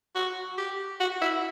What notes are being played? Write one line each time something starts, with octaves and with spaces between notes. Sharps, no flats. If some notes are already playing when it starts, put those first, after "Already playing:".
F#4
G4
F#4
E4